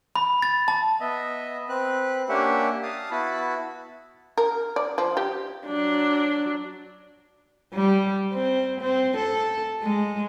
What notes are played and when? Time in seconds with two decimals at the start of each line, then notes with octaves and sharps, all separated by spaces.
0.16 B5
0.42 A6
0.68 A5
1.00 B3 D#5 E5
1.69 C4 B4 F#6
2.29 A#3 C#4 D4 G4 E5 F#5
2.83 F5 A5 D#6
3.11 B3 E4 F#4 A5 B5
4.38 A#4
4.76 D5
4.98 F3
5.17 G4
5.66 F#3 D4
7.74 G3
8.33 C4
8.81 C4
9.17 A4
9.82 G#3